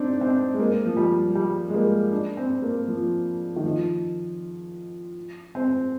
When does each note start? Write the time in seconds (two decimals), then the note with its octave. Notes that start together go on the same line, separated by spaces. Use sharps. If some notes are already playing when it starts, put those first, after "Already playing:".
Already playing: C4 D4 D#4
0.21 C4
0.53 G#3
0.59 A#3
0.86 F3
0.97 G3
1.35 G3
1.69 G#3
1.74 A#3
2.12 D4
2.37 C4
2.62 A#3
2.88 F3
3.56 D#3
3.64 F3
5.55 C4